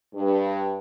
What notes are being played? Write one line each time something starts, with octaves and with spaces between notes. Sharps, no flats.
G2